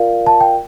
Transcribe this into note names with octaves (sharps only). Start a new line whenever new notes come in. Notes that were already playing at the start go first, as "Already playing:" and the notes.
Already playing: F4 A#4 D5 F5
A5
G5